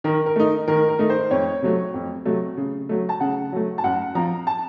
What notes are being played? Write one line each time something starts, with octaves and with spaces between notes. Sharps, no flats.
D#3 A#4
A#4
A3 D#4
D#3 A#4
A#4
A3 D#4
C5
F2 C#5
C3 F#3 A3
F2
C3 F#3 A3
C#3
F#3 A3
A5
C#3 F#5
F#3 A3
A5
F#2 F#5
F3 C4 A#5
A5